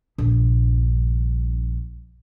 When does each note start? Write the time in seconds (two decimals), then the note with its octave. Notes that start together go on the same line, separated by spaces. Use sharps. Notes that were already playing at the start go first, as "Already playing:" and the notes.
0.18 A#1 G2